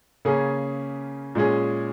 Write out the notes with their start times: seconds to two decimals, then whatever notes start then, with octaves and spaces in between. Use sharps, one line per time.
0.25 C#3 A#3 C#4 G#4
1.35 A#2 G#3 C#4 G#4